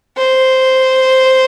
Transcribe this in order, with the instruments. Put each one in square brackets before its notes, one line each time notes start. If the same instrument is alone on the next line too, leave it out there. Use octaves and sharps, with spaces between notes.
[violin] C5